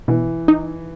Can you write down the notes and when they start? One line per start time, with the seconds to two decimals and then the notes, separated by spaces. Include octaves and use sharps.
0.08 B2 E3
0.48 D#4